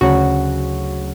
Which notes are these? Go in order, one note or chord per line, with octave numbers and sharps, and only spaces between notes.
D2 C#3 F#3 F#4